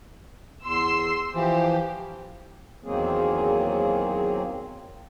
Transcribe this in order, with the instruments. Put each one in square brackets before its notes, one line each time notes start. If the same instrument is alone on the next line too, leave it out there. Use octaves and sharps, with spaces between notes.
[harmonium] E2 [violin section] C6 E6 C7
[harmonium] E3 F3 [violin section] G4
[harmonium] E2 D#3 F#3 A#3 C4 G#4